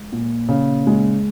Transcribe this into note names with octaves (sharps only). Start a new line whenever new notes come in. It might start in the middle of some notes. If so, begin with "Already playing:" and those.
Already playing: G#3
A#2
C#3
G#3